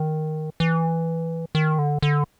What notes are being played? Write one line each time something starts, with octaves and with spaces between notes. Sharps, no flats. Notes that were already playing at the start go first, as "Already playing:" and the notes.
Already playing: D#3
E3
D#3
D3
D3